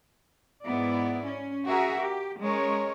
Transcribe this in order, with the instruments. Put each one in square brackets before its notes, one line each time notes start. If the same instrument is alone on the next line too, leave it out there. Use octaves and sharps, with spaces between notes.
[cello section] G#2 B3 E4 D5
C#4
F#4 G#4 A#4 E5
G4
G#3 C#4 A#4 C#5